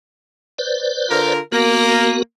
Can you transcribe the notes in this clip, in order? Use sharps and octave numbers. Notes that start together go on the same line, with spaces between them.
B4 C5 D5
D3 F4 A#4
A#3 B3 F#4 A#4